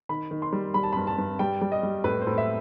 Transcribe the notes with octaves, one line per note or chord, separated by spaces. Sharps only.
D#3 B5
D#3
C6
G3
G3 B5
A5
G2 B5
A5
G2
G3 G5
G3
D#5
G3
A2 B4
C5
A2
E5